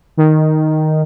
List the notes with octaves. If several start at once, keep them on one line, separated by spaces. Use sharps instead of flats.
D#3